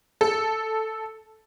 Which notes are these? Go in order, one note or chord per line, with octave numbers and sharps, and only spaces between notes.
A4